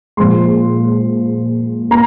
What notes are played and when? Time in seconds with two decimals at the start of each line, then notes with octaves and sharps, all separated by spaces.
0.17 A#2 F3 G#3 C6
1.91 A#3 A#5